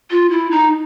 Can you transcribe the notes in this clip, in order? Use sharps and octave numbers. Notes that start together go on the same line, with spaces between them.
F4
E4
D#4